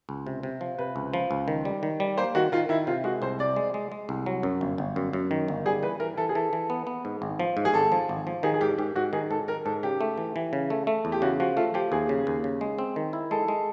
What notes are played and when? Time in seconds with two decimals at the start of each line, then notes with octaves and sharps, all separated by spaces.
0.09 C#2
0.27 C3
0.43 C3
0.61 F3
0.78 C3 B4
0.96 C#2
1.14 F3
1.31 C#2
1.48 D#3
1.65 G3
1.83 D#3
2.00 G3
2.18 A#3 C5
2.35 D#3 F#4
2.52 D#3 F4
2.69 D#3 E4
2.87 C3 F4
3.04 G#3 F#4
3.22 C2 C5
3.39 C3 D5
3.56 G#3
3.74 G#3
3.92 G#3
4.09 C2
4.26 F#3
4.43 F#2
4.61 G1
4.78 G1
4.96 F#2
5.13 F#2
5.31 D#3
5.48 G1
5.66 G3 G#4
5.83 E3 B4
6.00 E3 A#4
6.17 E3 A4
6.29 G#4
6.35 E3 A4
6.53 E3
6.70 B3
6.87 B3
7.05 G#2
7.22 G#1
7.39 F3
7.57 G#2
7.65 G#4
7.74 G#1 A4
7.92 F3
8.09 G#1
8.27 F3
8.43 D#3 G#4
8.54 G#4
8.61 G#2 G4
8.78 G#2 G4
8.96 G#2 F#4
9.13 D#3 G#4
9.31 G#2 A4
9.48 D#3 A#4
9.65 G#2 A4
9.83 C#3 G4
10.01 A3
10.18 E3
10.36 E3
10.53 C#3
10.70 A3
10.87 A3
11.05 E2
11.12 G4
11.22 C#3 F#4
11.40 F3 F#4
11.57 A3 F4
11.74 F3 G4
11.92 D#2 G#4
12.09 C#3
12.27 D#2
12.44 C#3
12.61 G#3
12.79 C4
12.96 D#3
13.13 E4
13.31 G#3 A4
13.48 G#3